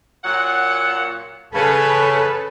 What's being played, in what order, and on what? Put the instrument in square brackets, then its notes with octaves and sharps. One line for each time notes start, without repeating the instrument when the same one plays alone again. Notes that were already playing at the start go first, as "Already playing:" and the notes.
[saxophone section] A#2 F#3 F#5
[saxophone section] C#3 [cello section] A4 B4